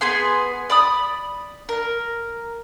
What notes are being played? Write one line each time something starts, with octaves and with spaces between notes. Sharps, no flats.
B3 G#4 G#5 C6
D5 B5 D#6
A#4